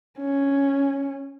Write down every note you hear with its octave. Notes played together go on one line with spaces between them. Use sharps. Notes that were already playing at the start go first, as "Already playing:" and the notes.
C#4